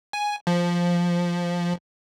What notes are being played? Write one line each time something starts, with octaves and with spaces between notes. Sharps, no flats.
G#5
F3